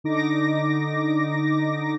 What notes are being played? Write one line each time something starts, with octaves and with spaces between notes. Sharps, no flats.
D3 D#4 D6 A#6